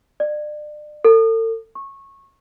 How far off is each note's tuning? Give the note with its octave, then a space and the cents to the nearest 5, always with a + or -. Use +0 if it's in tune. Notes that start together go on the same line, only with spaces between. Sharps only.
D5 +35
A4 +40
C#6 -20